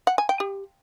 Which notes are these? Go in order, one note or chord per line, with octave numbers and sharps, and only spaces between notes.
F#5
G#5
G5
G4